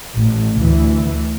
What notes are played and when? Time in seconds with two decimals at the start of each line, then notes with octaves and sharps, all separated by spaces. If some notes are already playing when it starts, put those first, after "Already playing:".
0.17 A1 A2
0.63 D2 E3